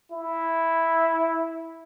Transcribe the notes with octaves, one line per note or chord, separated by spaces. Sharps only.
E4